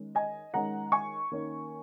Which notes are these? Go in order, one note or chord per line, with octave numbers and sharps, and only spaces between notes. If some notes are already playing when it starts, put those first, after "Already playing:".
Already playing: D#3 G#3 C#4
D#5 G#5
D#3 G#3 C#4 F#5 A#5
G#5 C#6
D#3 A#3 C#4